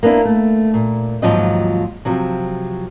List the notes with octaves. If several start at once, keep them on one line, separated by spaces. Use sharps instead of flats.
A#3 B3 D4 E4
A3
A#2
D#2 G#2 F3 F#3 F4 D#5
C3 F3 F#3